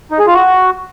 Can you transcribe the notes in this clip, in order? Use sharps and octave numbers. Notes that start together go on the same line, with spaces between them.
D#4
G#4
F4
F#4